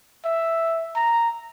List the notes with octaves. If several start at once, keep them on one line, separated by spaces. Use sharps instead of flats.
E5
A#5